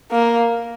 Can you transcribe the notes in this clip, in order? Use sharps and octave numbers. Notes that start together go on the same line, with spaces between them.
A#3